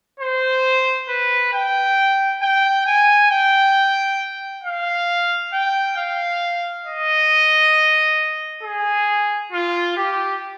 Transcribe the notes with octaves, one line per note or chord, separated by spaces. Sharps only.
C5
B4
G5
G5
G#5
G5
F5
G5
F5
D#5
G#4
F4
G4